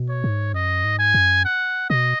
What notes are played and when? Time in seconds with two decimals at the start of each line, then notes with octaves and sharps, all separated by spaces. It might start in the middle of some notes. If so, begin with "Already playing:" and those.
Already playing: B2
0.09 C#5
0.24 G#2
0.54 F#2 D#5
0.84 G#2
0.99 G#5
1.14 F#2
1.45 F#5
1.90 B2 D#5